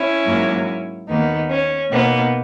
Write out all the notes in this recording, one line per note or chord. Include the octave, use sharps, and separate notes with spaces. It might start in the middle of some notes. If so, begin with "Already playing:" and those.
Already playing: C#4 E4
G#2 F#3 A#3
D#2 D#3 A#3 B3 D#4
C#4
B2 A#3 B3 D#4